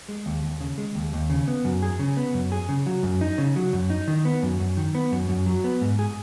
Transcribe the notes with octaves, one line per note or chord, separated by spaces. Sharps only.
G#3
D#2
D#2
C#3
G#3
D#2
D#2
C#3
B3
F#2
G#4
C#3
B3
F#2
G#4
C#3
F#3
F#2
D#4
C#3
F#3
F#2
D#4
D#3
B3
F#2
F#2
D#3
B3
F#2
F#2
F#3
B3
G#2
G#4